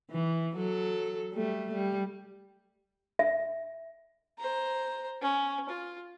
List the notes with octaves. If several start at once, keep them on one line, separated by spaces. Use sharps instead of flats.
E3
F#3 A4
G3 A3
G3
E5
C5 A#5
C#4
F4